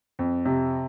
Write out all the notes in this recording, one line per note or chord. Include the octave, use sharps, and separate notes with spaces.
F2
C3